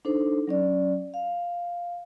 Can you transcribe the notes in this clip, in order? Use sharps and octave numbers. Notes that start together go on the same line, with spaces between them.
D4 D#4 A4 C5
F#3 C#4 D5
F5